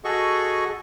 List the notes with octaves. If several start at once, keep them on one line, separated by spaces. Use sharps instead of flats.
F#4 G#4 A4 D#5 C#6